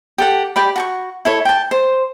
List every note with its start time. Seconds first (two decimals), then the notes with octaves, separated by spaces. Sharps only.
0.18 G4 A4 F#5
0.56 G4 D5 B5
0.76 F#4 A5 C#6
1.25 E4 A4 C#5
1.45 G5 A5
1.71 C5